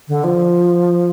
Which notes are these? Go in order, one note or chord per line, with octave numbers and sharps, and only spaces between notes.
D3
F3